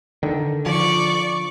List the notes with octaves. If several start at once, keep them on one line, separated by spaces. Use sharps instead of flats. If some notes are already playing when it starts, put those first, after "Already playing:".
D3 D#3
F3 D5 C#6